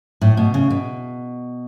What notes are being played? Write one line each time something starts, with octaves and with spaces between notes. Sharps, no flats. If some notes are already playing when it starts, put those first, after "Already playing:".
A2
B2
C#3
B2